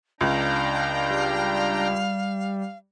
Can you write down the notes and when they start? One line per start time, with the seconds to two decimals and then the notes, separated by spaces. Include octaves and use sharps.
0.21 C#2 D4 F5 G5 A#5
1.10 G3